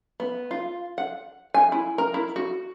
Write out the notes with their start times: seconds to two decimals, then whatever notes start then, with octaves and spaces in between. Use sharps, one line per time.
0.20 B3
0.51 F4
0.98 F#5
1.54 G#5
1.72 E4
1.98 A#4
2.14 E4
2.36 F#4